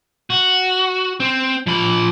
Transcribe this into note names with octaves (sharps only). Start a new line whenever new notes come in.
F#4
C4
F3 B5